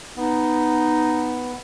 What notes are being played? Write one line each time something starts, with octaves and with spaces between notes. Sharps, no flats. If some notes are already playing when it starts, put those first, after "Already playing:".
B3 D#4